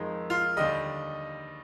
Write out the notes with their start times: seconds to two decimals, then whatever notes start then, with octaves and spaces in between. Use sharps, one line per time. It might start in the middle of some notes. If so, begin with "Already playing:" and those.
Already playing: F2 D#3 G#3
0.30 F4
0.57 D#2 D3 G3 D#5